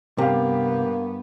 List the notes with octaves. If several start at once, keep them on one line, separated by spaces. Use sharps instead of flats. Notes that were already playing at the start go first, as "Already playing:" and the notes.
G2 C3 A#3 B3 G4 F5